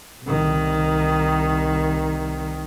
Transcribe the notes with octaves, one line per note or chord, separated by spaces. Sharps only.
C2 D#3